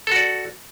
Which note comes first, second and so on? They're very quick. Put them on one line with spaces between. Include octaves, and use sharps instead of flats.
A4 F#4 D5